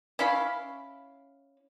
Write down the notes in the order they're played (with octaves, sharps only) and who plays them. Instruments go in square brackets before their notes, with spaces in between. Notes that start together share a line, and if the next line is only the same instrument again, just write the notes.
[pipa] C#4 E4 F5 B5